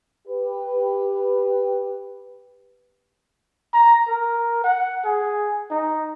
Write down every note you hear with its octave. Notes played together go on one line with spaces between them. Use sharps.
G4 B4
A#5
A#4
F#5
G#4
D#4